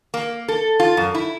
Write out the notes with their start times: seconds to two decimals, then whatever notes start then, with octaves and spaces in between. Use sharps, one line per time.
0.14 A#3
0.48 A4
0.80 F4
0.97 F#2
1.14 E4